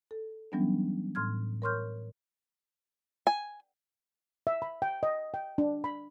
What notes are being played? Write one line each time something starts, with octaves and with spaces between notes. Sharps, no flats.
A4
E3 F#3 G3 B3 C#4 D4
A2 C6 F6 G#6
A#4 C#5 C6 C#6 F6 G6
G#5
E5
B5
G5
D#5
G5
D4
B5